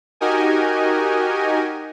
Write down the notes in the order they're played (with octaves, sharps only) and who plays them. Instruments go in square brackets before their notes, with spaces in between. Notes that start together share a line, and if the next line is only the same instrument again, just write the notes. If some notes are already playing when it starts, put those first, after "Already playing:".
[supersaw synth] D#4 F#4 G4 A#4 D#5 G#5